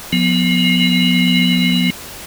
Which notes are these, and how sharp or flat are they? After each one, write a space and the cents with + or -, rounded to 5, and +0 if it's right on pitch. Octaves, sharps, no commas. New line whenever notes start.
F3 +40 B3 +0